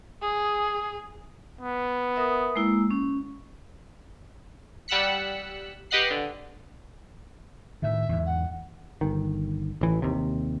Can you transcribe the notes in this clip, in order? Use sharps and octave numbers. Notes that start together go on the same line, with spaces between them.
G#4 D#6
B3
A#4 E5 D#6
G#3 A#3 E4
C#4
G3 F#5 E6 F#6 B6 C#7
G4 B4 D#5 F#5 F#6 C7
D3
A2 D#3 E5
E2 G#2
F#5
G1 D#3
A1 E3
D#2 C3